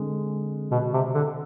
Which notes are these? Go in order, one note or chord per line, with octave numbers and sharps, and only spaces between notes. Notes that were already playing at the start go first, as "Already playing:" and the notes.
Already playing: D3 G#3 C4
B2
C3
D3